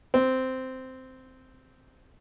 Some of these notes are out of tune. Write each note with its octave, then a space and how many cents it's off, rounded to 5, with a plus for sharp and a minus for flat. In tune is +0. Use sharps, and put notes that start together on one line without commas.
C4 -10